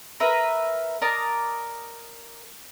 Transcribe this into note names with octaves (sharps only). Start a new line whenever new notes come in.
A#4 B4 E5
A#4 D5 D#5 A5